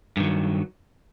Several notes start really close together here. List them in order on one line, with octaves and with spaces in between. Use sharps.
G2 D#3 F#3